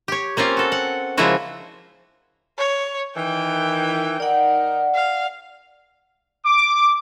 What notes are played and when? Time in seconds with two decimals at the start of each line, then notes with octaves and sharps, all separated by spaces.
0.08 G4 C#5
0.37 A#3 C4 C#4 F4
0.57 F#4 A4
0.72 F#5
1.17 C#3 F3 G#3 A#3 E4 F#4
2.58 C#5
3.17 D#3 E3 G5
4.20 D#3 D#4 A#4 D5 F#5
4.94 F5
6.45 D6